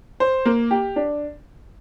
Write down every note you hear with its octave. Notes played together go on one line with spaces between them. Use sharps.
C5
A#3
G4
D4